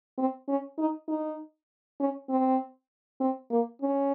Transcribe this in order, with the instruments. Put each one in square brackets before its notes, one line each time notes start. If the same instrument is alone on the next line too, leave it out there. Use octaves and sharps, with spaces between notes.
[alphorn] C4
C#4
D#4
D#4
C#4
C4
C4
A#3
C#4